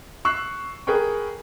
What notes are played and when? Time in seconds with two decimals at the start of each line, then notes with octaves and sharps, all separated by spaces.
0.25 C#6 E6 F#6 C7
0.87 G#4 A#4 B4 G5 C#6